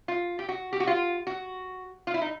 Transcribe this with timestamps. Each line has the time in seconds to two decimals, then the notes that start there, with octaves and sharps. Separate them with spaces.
0.08 F4
0.39 G4
0.49 F#4
0.73 G4
0.80 F#4
0.87 F4
1.27 F#4
2.07 F4
2.14 E4
2.22 D#4